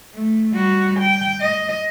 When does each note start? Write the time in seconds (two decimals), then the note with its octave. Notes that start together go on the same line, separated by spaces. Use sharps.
0.14 A3
0.54 G3 F#4
0.99 G5
1.40 D#5